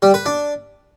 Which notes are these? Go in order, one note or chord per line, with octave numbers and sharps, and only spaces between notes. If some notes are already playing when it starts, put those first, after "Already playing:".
G3
B4
D4